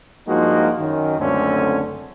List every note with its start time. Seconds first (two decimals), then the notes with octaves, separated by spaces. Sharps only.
0.28 G2 F3 G#3 A#3 D#4 F#4
0.80 F#2 D#3
1.19 C#2 F#2 D3 A3 C4 C#4